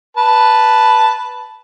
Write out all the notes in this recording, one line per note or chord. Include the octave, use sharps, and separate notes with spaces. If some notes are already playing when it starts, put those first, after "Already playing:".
B4 A5